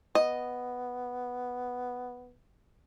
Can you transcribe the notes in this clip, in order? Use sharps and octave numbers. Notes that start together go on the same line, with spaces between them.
B3 D#5